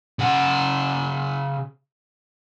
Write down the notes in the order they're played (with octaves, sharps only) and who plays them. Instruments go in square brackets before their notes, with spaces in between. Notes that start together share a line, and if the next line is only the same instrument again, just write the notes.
[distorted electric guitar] C#3 F#5